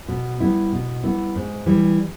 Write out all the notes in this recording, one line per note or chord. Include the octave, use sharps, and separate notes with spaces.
B2
G3 B3 E4
B2
G3 B3 E4
G#2
E3 G3